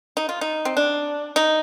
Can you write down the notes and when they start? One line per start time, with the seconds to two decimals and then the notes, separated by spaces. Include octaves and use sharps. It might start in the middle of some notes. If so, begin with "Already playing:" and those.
0.17 D#4
0.29 F4
0.41 D#4
0.65 C4
0.77 D4
1.36 D#4